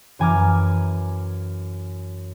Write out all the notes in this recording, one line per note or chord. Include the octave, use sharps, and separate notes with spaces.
F#2 E3 G#5 A#5 D6 F6